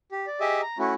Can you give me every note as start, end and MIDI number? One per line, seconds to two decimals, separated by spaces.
0.12 0.26 67
0.27 0.40 74
0.40 0.61 67
0.40 0.61 68
0.40 0.61 75
0.40 0.61 76
0.40 0.61 86
0.62 0.78 82
0.79 0.94 57
0.79 0.94 61
0.79 0.94 64
0.79 0.94 66